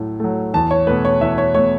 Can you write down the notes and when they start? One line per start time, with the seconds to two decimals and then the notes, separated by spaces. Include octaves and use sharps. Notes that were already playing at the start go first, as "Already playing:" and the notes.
Already playing: A2 F#3 A3
0.20 F#3 A3
0.54 E2 A5
0.71 C#5
0.87 B2 A3 B4
1.05 C#5
1.21 E2 E5
1.38 C#5
1.54 B2 A3 C#5